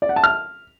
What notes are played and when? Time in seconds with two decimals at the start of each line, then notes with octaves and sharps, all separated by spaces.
0.02 D5
0.09 F#5
0.16 A5
0.24 F6